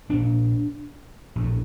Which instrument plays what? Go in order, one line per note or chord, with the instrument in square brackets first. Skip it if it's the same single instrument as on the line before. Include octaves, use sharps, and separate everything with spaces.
[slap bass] A#1 A#2 D4
A#1 A2